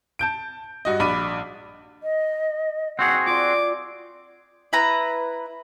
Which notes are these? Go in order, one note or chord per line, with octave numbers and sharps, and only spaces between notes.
A5 G6 D7
G2 F#4 D#5
A#1 D4 B5 B6 D#7
D#5
C4 F#4 G#4 F#5
F4 D5 C6 D6
E4 B4 A#5